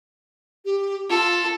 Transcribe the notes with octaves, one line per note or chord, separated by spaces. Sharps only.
G4
F4 A4